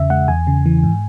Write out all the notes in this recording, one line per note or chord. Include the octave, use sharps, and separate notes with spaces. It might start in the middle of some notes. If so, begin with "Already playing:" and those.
Already playing: E2 C#3 E5
G#3 F#5
E2 G#5
C#3
E3
G#2